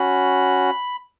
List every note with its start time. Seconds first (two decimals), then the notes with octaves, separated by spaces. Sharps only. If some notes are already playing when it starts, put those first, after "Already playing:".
Already playing: C#4 F#4 B5